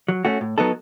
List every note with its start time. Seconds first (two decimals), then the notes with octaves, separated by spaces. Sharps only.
0.08 F#3
0.25 A3 C#4 F#4
0.41 A2
0.58 F#3 B3 D#4 A4